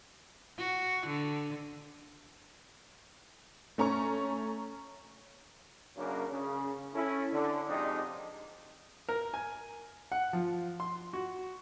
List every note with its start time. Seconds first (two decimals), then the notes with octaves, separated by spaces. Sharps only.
0.58 F#4
1.07 D3
3.78 A3 C#4 A#5 C#6
5.97 F#2 C#3 A#3 C#4 D4 A#4
6.30 C#3
6.94 C#4 E4 A4
7.33 D3
7.68 F2 C3 G#3 D4 D#4
9.09 A#4
9.34 G#5
10.12 F#5
10.33 F3
10.80 C6
11.13 F#4